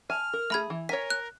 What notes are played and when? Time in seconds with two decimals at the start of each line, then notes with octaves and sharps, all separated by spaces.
0.10 G#5 A5 F6
0.33 A#4
0.50 A3 G#4 E5 B5 G#6
0.70 E3
0.89 A#4 C#5 G#5 B6
1.10 F#6